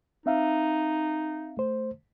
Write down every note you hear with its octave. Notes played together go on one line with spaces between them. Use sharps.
C4 D#4 E5 F5
A3 C5